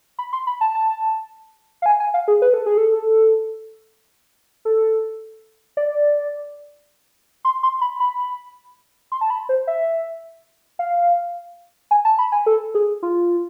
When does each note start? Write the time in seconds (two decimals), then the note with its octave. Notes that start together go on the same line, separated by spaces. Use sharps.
0.19 B5
0.33 C6
0.47 B5
0.61 A5
0.75 A5
1.82 F5
1.86 G#5
2.00 G#5
2.14 F5
2.28 G#4
2.42 B4
2.54 A4
2.66 G#4
2.78 A4
4.65 A4
5.77 D5
7.45 C6
7.63 C6
7.81 B5
8.00 B5
9.12 C6
9.21 A5
9.30 B5
9.49 C5
9.67 E5
10.79 F5
11.91 G#5
12.05 A5
12.19 B5
12.32 G#5
12.46 A4
12.75 G#4
13.03 F4